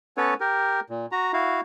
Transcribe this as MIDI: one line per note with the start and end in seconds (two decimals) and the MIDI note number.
0.17 0.34 59
0.17 0.34 61
0.17 0.34 69
0.17 0.34 71
0.17 0.34 73
0.40 0.80 67
0.40 0.80 70
0.90 1.06 46
1.12 1.32 66
1.12 1.32 82
1.33 1.61 64
1.33 1.61 66
1.33 1.61 77